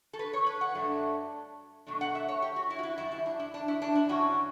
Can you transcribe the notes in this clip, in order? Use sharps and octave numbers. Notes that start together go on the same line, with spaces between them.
A4
B4
C#5
B4
F#5
G2 F#3 A3 D4
B2 F#3 A3 D4
F#5
E5
C#5
G4
F#4
E4
F#4
E4
F#2 E3 G3 E4
E4
D4
E4
D4
E4
D4
E4
G2 E3 C#4 F#4